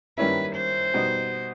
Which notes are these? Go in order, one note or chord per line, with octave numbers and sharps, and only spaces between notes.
D#3 G3 A#3 C#4 E4 B4
C5
B2 G3 B3 D#4